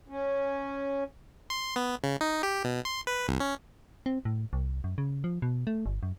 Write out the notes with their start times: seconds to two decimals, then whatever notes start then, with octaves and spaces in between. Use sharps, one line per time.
0.08 C#4
1.50 C6
1.76 B3
2.04 C#3
2.21 D#4
2.43 G4
2.64 B2
2.85 C6
3.07 B4
3.28 C2
3.40 C#4
4.06 C4
4.25 A2
4.53 C2
4.84 F#2
4.98 C#3
5.24 F3
5.42 B2
5.67 A3
5.86 G1
6.03 F#2